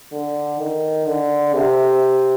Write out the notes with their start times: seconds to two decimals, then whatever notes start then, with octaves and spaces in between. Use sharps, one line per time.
0.12 D3
0.59 D#3
1.06 D3
1.54 C3